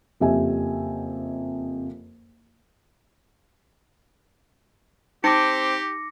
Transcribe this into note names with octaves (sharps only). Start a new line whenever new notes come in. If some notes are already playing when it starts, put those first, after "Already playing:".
F#1 F2 G4 E5 G#5
C4 D#4 G4 D6 A#6 C#7